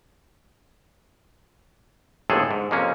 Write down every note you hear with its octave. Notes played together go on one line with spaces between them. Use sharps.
G1 D#2 A2 C3 G#4 A4
G#2
F2 C3 A#3 C#4